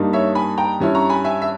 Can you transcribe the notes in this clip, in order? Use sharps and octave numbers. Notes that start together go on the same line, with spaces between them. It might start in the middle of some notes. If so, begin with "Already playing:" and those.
Already playing: G2 G3 A#3 D#4
C#5 E5
G#5 B5
G5 A#5
G2 G3 C#4 E4
A#5 C#6
G#5 B5
E5 G#5
E5